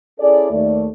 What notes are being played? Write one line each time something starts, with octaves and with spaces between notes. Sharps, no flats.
C#4 E4 G#4 A4 D5
D#2 A3 D5